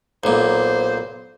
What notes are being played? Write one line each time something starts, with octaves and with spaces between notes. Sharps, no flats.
B1 A#2 C5